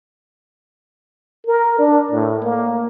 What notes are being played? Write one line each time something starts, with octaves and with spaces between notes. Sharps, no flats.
A#4
D4
A2
A#3